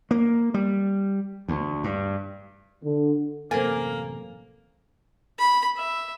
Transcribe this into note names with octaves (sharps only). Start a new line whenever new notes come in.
A#3
G3
D2
G2
D3
A1 F#2 C3 A#3 A4 A#4 C5 G#5
B5
E5